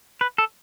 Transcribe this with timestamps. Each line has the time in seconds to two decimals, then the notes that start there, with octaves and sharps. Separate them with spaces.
0.21 B4
0.38 A4